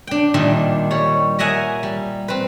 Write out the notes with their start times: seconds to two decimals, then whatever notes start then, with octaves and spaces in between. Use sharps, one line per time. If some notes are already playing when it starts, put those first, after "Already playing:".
0.07 D4 G5
0.34 A#2 D#3 G3 D4 E5
0.91 G3 C#5
1.39 A#4 D#5 E5 F#5 G#5 A#5
1.83 G3
2.28 C4 B4